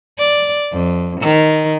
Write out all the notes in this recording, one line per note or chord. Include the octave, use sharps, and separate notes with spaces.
D5
F2
D#3